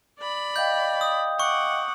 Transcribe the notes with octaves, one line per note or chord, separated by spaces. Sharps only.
D5 B5
D#5 F5 G5 G6
D#6
F#5 C#6 D6